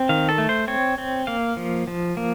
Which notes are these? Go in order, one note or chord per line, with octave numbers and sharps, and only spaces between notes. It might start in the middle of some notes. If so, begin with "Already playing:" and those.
Already playing: C4
D#3 F5
A4
A3
C5
C4 C#5
C4
A#3 F5
F3
F3
A#3